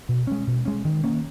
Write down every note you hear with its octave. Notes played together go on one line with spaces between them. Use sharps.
B2
G#3 C#4
B2
G#3 C#4
D#3
A#3 C#4